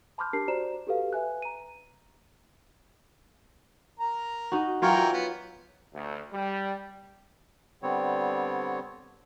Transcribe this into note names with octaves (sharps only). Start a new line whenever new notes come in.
A5 B5 C6 D6 F6 G6
D4 G4 A#4 A5 C7
F#4 C5 D5 A#5 E7
F#4 G4 A4 B4 F5
B4 E5 G#5 F#6
A#5 D#7
A#4 A#5
D#4 F#4
E3 F#3 F4 A#4 C#5 G5
B3
D2
G3
D3 G3 B3 C4 C#5